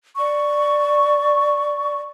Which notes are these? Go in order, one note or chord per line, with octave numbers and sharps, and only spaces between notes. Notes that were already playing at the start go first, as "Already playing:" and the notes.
D5 C#6